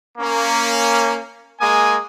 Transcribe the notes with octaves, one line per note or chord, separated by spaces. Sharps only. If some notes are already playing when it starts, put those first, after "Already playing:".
A#3 C#4
G#3 A#3 G#5 D#6